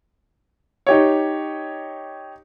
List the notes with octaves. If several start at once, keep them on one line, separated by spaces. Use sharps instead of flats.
D#4 G4 C#5